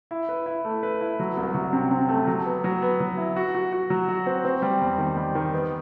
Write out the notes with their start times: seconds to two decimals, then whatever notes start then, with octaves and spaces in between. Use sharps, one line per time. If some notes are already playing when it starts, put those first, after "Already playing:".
0.11 E4
0.29 B4
0.46 E4
0.65 A3
0.83 B4
1.01 E4
1.20 F#3
1.37 C2
1.55 F#3
1.73 C3
1.91 C3
2.09 A3
2.27 F#3
2.46 B3
2.64 F#3
2.82 B3
3.00 F#3
3.17 E4
3.36 F#4
3.55 F#4
3.72 F#4
3.90 F#3
4.08 F#4
4.27 C4
4.45 C4
4.62 G3
4.81 E2
4.98 D#3
5.16 G3
5.35 D#3
5.53 B3